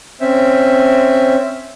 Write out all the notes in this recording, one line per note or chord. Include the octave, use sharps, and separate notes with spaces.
C4 C#4 E5